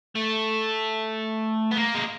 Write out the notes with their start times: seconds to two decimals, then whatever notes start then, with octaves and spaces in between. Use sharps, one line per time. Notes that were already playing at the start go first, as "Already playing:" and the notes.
0.16 A3
1.71 B3
1.77 A#3
1.94 G#3